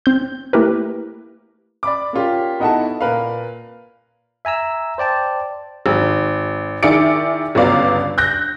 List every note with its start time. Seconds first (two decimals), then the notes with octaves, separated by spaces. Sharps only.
0.06 C4 G6
0.53 A3 A#3 E4 G4 A#4 B4
1.83 D5 B5 D6
2.13 A#3 C#4 F4 G4
2.60 B3 D#4 E4 F#4 A4 A5
3.01 A#2 A#4 B4 F5
4.45 E5 G#5 A#5 E6
4.98 C5 D5 G5 A5
5.86 G#1
6.83 D#3 E4 G#4 D5 C#7 D7
7.55 G1 C#2 B3 F#4 D5 F5
8.18 F#6 G6 A#6